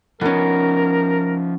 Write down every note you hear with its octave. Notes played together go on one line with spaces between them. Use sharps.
F3 B3 C#4 D#4 A#4